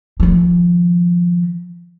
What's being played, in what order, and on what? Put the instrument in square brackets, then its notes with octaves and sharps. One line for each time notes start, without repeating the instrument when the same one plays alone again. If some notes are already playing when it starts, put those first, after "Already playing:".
[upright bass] D#3 F3